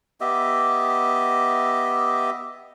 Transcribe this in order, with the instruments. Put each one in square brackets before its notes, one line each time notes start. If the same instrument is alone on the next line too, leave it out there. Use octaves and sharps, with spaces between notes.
[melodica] B3 G4 D#5 E5